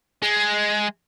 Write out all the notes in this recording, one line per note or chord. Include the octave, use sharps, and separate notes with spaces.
G#3